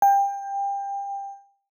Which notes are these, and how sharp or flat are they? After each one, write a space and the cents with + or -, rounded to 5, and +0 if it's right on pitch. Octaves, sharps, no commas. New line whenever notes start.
G5 +25